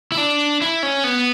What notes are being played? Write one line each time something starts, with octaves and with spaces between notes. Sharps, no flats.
E4
D4
E4
C#4
B3